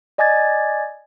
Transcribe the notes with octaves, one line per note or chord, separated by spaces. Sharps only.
D5 D#5 G#5 D6 G#6 A6